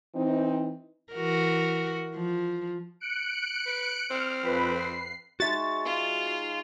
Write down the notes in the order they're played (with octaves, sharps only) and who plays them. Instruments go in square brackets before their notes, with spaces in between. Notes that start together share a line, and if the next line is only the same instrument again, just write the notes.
[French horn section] E3 C4 D#4
[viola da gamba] E3 F#4 A#4
F3
[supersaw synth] F#6 C#7 D7
[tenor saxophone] B4
[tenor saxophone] C4 [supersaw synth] F6
[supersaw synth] F2 B4 B5
C7
[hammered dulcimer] G#3 D#4 C#5 [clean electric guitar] F#4 E5 [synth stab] A6
[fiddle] F4